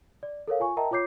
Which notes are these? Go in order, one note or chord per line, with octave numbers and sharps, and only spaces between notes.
D5
A4 A#4 C#5 F5
F4 G#5 C#6
A#4 D#5 E5 G5 A5 A#5
F4 C#5 D6 G6 C7